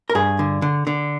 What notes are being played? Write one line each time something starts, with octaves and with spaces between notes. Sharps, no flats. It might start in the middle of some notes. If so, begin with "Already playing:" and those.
A#4
G2 G#4
D3
D3
D3